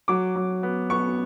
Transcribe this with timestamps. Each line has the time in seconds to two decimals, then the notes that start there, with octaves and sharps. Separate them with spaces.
0.08 F#3 D6
0.36 F#3
0.63 B3
0.90 B3 C#6